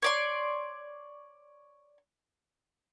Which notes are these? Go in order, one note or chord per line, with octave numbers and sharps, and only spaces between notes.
C#5 D5 C6